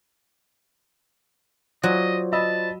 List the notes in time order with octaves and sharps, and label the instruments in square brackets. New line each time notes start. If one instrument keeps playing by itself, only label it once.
[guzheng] F#3 [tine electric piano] F4 C5 D5 [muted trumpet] D#5
[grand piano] D#5 B5 E6 [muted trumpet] A5